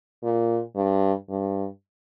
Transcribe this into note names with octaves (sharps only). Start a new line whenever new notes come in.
A#2
G2
G2